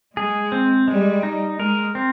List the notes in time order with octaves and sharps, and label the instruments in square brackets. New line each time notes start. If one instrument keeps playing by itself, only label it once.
[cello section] G#3 [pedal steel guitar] G#4
[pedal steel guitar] C4
[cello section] G3 [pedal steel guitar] G#3
[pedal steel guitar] D#4
[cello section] G#3 [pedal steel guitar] A#4
[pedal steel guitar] C4